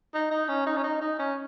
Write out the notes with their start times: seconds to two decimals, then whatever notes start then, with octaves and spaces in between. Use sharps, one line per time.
0.14 D#4
0.31 D#4
0.48 C#4
0.66 D#4
0.76 C#4
0.83 D#4
1.01 D#4
1.19 C#4